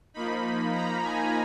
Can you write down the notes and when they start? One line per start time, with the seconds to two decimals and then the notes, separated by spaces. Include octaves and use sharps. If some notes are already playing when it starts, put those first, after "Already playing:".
0.14 F3 A#3 D#4 B5
0.73 A#5
1.03 G#5